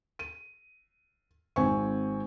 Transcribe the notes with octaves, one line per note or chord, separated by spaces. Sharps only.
D#7
G#1 C4 G#5 C#6